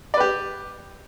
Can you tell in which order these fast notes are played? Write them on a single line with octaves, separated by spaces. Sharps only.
D5 B4 G4